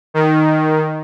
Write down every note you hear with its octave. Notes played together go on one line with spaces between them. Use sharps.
D#3